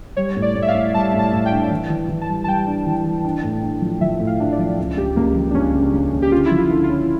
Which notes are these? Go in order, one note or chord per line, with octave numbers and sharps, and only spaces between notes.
G3 C#5
A2
D5
A2
E5
F5
A2
G3 A5
A2
A5
A2
G5
D4
E3
E3
E3
A5
G3
A5
G3 G5
D4
E3
E3
D4
A2
D4
F3
F3 E5
A2
F5
D4
D5
F3
C#2
C#2 G4
C#2 A#3
F3
D4
C#2 C#4
C#3
C#2
C#3
G4
D3 F4
E4
F3
F4
D3
F4
C#4